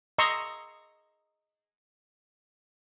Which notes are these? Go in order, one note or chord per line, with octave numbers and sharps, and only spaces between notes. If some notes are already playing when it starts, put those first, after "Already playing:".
D#5 A#5 C6 C#6 D#6 E6